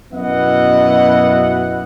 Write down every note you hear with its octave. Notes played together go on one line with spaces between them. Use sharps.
F#2 B2 B3 E4 D#5 F#5